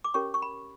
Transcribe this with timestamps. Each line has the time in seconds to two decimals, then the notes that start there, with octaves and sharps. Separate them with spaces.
0.04 D6
0.14 C#4 G4 A#4 C#5 C#6
0.34 C#6
0.42 B5